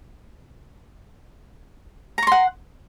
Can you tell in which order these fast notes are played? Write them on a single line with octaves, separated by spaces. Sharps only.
A#5 C#6 C6 F#5